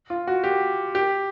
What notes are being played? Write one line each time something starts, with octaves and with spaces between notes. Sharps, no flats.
F4
F#4
G4
G4